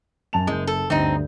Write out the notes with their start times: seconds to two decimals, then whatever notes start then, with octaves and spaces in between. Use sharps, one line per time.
0.33 F#2 A5 F7
0.47 F#1 F#2 G#3 G6
0.67 A4
0.90 D2 G2 C4 D#4